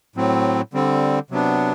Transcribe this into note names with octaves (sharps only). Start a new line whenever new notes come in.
A2 F#3 C4
D3 G3 C4
C3 F#3 B3 D4